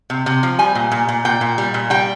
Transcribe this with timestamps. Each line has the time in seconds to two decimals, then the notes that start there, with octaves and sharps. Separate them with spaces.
0.10 C3
0.26 C3
0.43 F3
0.59 G3 G#5
0.75 A#2
0.92 A#2
1.09 A#2
1.25 A#2 G5
1.41 A#2
1.58 G3
1.74 A#2
1.90 G3 G5